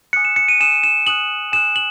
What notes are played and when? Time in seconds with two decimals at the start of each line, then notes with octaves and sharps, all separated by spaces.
0.13 G#5 D#6 F#6 C#7
0.25 E7
0.36 C#7
0.48 D#7
0.60 G#5 D#6 F#6 E7
0.83 E7
1.07 G#5 D#6 F#6 F#7
1.52 G#5 D#6 F#6 E7
1.76 F#7